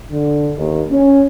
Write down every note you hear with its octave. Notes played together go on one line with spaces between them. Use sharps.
D3
D#2
C#4